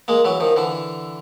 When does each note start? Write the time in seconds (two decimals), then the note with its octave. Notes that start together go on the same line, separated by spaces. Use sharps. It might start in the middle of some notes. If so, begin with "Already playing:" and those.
0.08 G#3 A#3
0.25 E3 F#3
0.40 D#3 F3
0.56 D3 E3